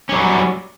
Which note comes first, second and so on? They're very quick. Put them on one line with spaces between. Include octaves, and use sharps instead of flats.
C#4 G3 F#3